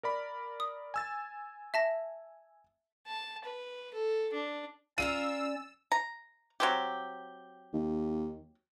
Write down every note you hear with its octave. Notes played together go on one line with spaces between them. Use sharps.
A#4 D5 B5
D#6
G#5 E6 A6
E5 A5 A#6
A5
B4
A4
D4
C#4 F4 G4 A#4 D5 E6 D#7
A#5
F#3 C4 G4
D#2